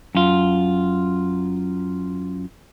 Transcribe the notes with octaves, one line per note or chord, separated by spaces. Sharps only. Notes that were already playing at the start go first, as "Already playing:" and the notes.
F#2 F4